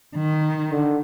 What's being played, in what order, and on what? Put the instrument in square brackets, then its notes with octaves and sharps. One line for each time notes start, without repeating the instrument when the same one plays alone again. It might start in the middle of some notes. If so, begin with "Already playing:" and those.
[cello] D#3
[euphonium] D3